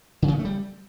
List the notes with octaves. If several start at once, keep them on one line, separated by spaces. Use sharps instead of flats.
D3
C#3
B3
A3
G3